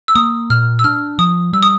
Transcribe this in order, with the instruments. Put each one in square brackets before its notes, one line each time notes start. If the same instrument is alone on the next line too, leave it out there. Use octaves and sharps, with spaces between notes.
[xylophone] E6
[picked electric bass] A#3 [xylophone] D#6
[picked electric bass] A#2 [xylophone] F6
[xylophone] E6
[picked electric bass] D4 [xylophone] F6
[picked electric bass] F3 [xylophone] D#6
[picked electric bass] G3 [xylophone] E6
[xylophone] D#6